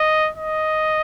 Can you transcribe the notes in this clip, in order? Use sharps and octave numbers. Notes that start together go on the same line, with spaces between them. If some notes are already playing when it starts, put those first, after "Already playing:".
Already playing: D#5
D#5